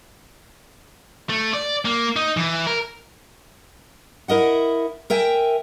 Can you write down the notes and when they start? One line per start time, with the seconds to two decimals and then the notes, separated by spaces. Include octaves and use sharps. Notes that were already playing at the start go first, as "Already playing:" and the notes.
1.29 A3
1.53 D5
1.85 A#3
2.16 D#4
2.37 E3
2.67 A#4
4.28 E4 A#4 D#5 F#5
5.10 A#4 E5 G5 G#5